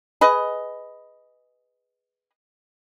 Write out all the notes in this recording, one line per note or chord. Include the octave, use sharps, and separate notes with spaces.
G#4 B4 D#5